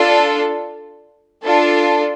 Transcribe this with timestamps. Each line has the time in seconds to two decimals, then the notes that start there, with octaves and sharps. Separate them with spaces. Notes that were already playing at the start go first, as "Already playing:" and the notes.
Already playing: D4 F4 A4
1.43 D4 F4 A4